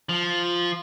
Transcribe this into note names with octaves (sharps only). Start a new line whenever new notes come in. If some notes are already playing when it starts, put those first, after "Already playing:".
F3